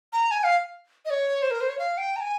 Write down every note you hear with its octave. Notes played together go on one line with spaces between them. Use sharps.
A#5
G#5
F5
D#5
C#5
C5
A#4
C5
C#5
F5
G5
A#5
G#5